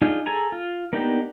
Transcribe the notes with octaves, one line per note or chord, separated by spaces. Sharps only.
D4 D#4 F4 G#4
G#4 A4 G#5 A#5
F4
A#3 B3 D4 D#4 G4